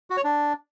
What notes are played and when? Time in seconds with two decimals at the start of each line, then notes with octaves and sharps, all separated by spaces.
0.10 F#4
0.17 C#5
0.24 D4